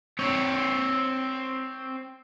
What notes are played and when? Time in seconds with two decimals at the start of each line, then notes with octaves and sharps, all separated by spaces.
0.19 C4 C#5